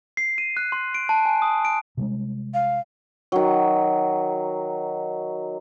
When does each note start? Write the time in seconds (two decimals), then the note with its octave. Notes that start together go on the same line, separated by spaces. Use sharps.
0.17 C7
0.38 D#7
0.57 F#6
0.72 C6
0.94 D7
1.09 A5
1.25 G#5
1.42 D#6
1.65 D7
1.97 C3 G3 G#3
2.54 F5
3.32 D#3 F#3